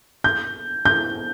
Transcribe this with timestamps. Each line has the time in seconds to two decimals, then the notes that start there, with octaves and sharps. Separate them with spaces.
0.24 G6
0.85 G6